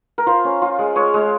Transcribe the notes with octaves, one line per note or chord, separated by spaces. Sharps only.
A#4
F4 C5
C#4
F4
G#3
G#3 C#5
G#3